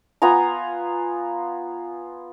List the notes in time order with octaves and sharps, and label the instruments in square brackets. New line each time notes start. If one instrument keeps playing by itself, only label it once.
[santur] B3 F4 G#5 A#5